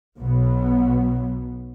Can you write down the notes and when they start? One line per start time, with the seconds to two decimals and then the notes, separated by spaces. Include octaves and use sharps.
0.19 B1 B2 F#3 B3